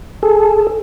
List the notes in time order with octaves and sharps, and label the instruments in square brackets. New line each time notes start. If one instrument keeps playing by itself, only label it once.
[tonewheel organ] G#4 A4